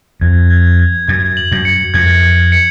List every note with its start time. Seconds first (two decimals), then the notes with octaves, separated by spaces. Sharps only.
0.21 F2 G#6
0.50 G#6
0.79 G#6
1.08 F#2 G#6
1.37 F#7
1.52 F#2
1.65 C#7
1.94 F2 G#6
2.23 G#6
2.52 C#7